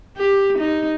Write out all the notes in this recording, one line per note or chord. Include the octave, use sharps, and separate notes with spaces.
G4
D#4